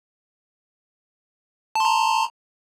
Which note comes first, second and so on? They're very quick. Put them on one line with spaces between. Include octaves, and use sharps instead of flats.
A5 C6 A#5